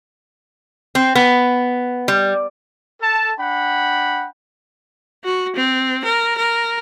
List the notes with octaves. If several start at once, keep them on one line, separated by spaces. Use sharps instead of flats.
C4
B3
G3
A4 A5
D4 F#5 G5 B5
F#4
C4
A#4
A#4